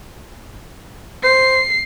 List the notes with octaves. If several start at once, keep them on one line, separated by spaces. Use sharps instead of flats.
C5 C7